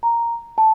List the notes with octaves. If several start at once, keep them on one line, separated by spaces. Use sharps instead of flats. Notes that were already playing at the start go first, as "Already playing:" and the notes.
A#5
A5